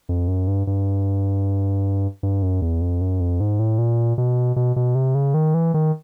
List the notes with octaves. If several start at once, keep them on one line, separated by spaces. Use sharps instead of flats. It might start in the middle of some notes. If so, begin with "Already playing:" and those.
F2
F#2
G2
G2
G2
F#2
E2
F2
F#2
F2
G#2
A2
A#2
B2
B2
B2
C3
C#3
D#3
E3
D#3